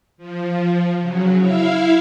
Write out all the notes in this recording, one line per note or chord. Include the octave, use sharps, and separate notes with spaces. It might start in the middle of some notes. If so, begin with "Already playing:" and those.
F3
C#3 F#3
E4 E5 F5